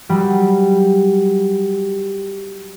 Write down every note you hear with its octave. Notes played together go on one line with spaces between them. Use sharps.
F#3 G3